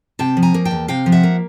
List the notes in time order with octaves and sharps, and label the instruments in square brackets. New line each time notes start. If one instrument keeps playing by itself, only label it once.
[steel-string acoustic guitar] C3 G5 A5
F3
G#5 A#5
A#3
G5 A5
E2
C3 F5 G5
F3
E5 F#5
A#3